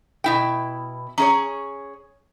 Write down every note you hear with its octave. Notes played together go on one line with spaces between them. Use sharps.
B2 E4 G5
C#4 G#4 C#5 A#5